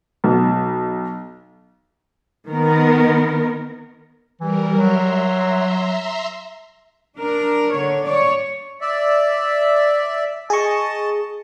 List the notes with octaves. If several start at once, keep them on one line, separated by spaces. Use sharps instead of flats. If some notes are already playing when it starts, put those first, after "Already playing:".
B1
D#3 B3 A#4
E3 G3 A#4
F#3 E5 A#5 C6
D4 A#4
D3 C#5
C#5 D5
D5 E5
G#4 D#5 A5 C#6